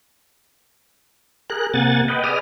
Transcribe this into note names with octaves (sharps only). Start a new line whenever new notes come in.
G#4 A#4 F#6
C3 A#3 F#5 G#5 A6
B4 D#5 F#5 G5
G#4 B4 D5 D#5 D#6 F6